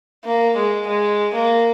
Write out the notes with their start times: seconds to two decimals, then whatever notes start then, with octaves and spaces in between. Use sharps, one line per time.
0.24 A#3
0.56 G#3
0.87 G#3
1.34 A#3